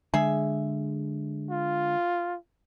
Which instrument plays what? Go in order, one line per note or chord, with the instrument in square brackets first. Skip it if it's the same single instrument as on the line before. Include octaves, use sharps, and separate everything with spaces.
[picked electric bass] D3 G#3 [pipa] G#4 E5
[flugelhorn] F4